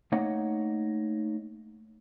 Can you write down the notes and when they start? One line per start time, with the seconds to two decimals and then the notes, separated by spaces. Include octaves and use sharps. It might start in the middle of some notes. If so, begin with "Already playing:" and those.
0.12 A3 A#3 D#4 C#5 D#5 F#5